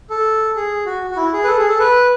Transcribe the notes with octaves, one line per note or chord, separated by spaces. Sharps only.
A4
G#4
F#4
F#4
E4
G#4
B4
A4
G#4
A4
B4